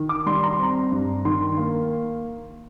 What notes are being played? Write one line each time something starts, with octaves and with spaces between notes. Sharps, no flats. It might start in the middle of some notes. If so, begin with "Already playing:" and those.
Already playing: D#3
D6
G3 C6
A#5
C6
C4 A#5
G2
D#3 C6
A#3